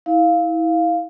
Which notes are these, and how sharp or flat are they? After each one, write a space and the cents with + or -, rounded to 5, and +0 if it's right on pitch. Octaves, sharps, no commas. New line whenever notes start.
E4 -30 F5 +0